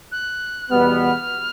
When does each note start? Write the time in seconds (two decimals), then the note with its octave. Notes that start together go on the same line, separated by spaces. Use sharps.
0.12 F#6
0.71 E2 B2 G3 B3 F6